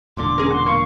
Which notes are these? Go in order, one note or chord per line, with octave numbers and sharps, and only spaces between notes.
E1 A#2 D3 C6 D6
C#4 G#4 A#4
F#4 C6
A#3 F5 C#6